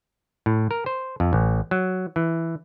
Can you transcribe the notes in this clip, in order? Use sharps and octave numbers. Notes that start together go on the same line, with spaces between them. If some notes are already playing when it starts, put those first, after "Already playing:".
A2
A#4
C5
F2
A1
F#3
E3